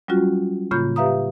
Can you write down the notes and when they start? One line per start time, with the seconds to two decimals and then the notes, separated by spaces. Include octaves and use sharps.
0.08 F#3 G3 C#4 F4 F#4
0.71 A2 C#3 A#3 F4 B5 G6
0.96 G4 B4 E5 F5 A#5 D#6